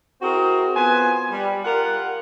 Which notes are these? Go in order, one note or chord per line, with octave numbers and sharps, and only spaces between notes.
C4 E4 F#4 G#4 A#4
B3 F4 C5 G#5
G3
F4 G4 A#4 F#5